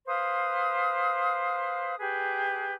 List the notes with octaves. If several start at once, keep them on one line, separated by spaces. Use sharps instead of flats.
B4 C5 F5 D#6
G4 G#4 B4